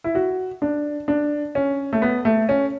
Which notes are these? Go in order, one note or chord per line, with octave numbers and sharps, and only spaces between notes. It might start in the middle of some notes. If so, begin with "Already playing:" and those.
E4
F#4
D4
D4
C#4
A3
B3
A3
C#4